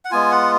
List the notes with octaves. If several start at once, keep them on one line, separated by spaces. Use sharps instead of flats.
F#5
G#3 B3 F4 G#5
F#5